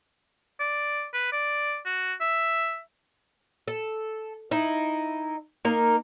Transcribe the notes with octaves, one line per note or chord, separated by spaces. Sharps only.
D5
B4
D5
F#4
E5
A4
D#4 E4
A#3 D#4 A#4